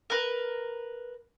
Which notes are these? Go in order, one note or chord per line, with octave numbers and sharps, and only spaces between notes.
A#4 B4